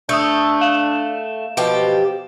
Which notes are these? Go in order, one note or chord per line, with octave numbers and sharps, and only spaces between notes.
A3 D4 D#6 E6 G6
F5 E7
B2 F3 G4